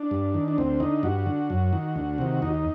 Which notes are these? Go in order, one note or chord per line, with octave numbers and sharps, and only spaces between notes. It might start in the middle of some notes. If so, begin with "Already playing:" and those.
Already playing: D4
G2
D#3
D4
D2 C4
D3 D#4
G2 F#4
D3
F#2
D#3
D2
C3 D#3
D#2 D#4